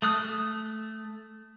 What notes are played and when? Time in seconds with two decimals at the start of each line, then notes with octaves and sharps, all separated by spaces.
0.02 A3 D#6 F#6